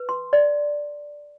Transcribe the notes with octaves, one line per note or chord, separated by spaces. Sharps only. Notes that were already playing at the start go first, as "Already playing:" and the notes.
Already playing: B4
C6
D5